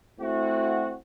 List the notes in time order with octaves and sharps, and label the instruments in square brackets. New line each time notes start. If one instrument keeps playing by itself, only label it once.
[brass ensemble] A3 C4 E4 F#4